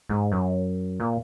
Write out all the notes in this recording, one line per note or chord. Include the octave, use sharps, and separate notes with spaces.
G#2
F#2
A#2